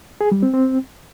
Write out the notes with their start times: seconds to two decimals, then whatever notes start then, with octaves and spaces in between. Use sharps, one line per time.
0.21 G#4
0.32 G3
0.43 C4
0.53 C4